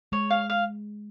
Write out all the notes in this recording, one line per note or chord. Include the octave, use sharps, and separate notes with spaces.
G#3 C#5
F5
F5